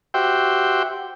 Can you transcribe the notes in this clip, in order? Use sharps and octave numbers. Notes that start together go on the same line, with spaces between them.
F#4 G4 C5 E5 G5